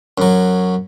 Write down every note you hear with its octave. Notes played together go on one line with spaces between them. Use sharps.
F#2 F#3